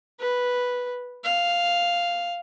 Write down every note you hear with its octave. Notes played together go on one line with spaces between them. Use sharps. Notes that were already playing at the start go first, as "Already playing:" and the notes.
B4
F5